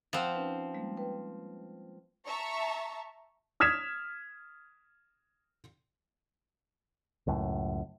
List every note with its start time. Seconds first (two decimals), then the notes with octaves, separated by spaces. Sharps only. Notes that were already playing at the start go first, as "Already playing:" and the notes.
0.13 F3 C4 C5 F#5 F#6
0.34 C#4 D#4 B4
0.74 G3 G#3 A#3
0.97 B4 G5
2.27 E5 A5 A#5 C#6
3.60 D#6 F6 G#6 B6 E7
7.27 C#2 F#2 A2